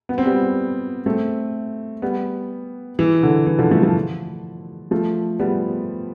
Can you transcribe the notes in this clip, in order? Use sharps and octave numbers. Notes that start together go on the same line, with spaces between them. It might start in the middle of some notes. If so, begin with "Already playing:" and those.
B3
C4
G3 B3
A3 C4
G3 B3
E3
D3
E3
D3 F3
F3 A3
F3 A3
F3 A3
G3 B3